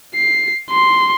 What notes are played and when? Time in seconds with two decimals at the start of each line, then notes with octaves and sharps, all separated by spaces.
0.15 C7
0.70 C6